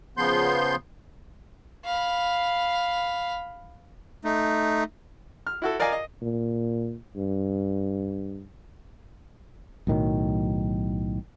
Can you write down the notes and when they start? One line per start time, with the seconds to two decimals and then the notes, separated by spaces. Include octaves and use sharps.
0.17 C#3 F3 B3 C6 G6
1.85 F5 B5
4.25 A3 D#4
5.47 F6
5.62 E4 F#4 A4
5.80 A#4 D5 D#5 F5 G#5
5.92 D#5
6.22 A#2
7.16 G2
9.87 B1 A2 D#3 F#3